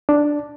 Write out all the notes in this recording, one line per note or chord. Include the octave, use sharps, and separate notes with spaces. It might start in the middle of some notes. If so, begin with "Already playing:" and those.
D4